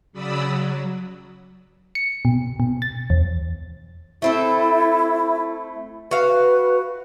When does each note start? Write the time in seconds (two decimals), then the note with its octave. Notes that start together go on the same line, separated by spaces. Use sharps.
0.13 C#3 F#3 D5 B5 D#6 E6
0.42 F#3
1.95 C#7
2.25 B2
2.60 B2
2.82 A6
3.10 E2
4.22 A3 C4 E4 A4
6.11 F#4 B4 F5